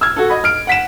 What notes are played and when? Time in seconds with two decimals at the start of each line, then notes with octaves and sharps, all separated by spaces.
0.01 E6 F6 G#6
0.17 F#4 A4
0.30 D#5 B5
0.44 F6 D7
0.67 F#5 B6 E7